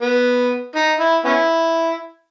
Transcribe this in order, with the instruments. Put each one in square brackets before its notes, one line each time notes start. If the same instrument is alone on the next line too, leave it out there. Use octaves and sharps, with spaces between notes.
[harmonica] B3
D#4
E4
B3 C#4 E4